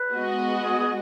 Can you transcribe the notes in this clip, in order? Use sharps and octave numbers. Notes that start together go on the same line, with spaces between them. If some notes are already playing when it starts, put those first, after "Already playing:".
Already playing: B4
G#3 B3 F#4 D#5
G#4
G#4